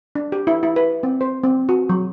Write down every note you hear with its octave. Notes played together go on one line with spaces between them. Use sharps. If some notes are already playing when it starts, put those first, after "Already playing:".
D4
G4
E4
E4
B4
C4
C5
C4
F#4
F#3